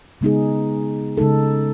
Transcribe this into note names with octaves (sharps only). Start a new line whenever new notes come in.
C#3 G#3 B3 D#4 G#4
C#3 G#3 D#4 A4